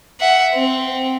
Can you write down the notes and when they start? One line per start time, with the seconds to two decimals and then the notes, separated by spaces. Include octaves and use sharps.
0.20 E5 F#5
0.55 C4